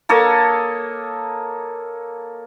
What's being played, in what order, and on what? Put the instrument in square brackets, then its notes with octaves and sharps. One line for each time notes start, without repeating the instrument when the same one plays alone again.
[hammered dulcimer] A#3 A4 C#5 D#5